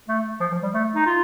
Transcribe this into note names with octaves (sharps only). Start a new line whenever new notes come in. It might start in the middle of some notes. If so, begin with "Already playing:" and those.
A3
F3
F3
G3
A3
D#4
F4